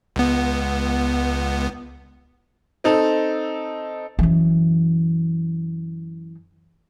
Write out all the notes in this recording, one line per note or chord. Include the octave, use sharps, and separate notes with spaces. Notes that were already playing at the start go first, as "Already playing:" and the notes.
C#2 B3
C4 D#4 A4
F#2 E3